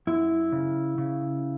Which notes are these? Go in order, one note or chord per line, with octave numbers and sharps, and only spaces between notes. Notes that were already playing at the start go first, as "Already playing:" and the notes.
F#2 E4
C#3
C#3